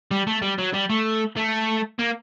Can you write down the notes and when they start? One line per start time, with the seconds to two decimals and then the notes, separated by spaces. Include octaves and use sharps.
0.11 G3
0.27 A3
0.42 G3
0.59 F#3
0.74 G3
0.90 A3
1.37 A3
1.99 A#3